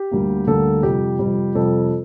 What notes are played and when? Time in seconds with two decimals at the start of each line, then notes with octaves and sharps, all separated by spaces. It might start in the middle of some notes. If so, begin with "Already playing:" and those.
Already playing: G4
0.11 D2 D3 G3 A#3
0.47 D2 D3 G3 A#3 A4
0.83 F2 C3 G3 G4
1.19 F2 C3 G3
1.55 F2 C3 G3 A4